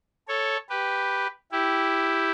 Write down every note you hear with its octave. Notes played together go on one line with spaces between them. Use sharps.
A4 C#5
G4 B4
E4 G4